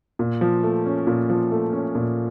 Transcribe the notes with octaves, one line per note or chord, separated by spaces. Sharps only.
A#2
F3
A3
C#4
A#2
F3
A3
C#4
A#2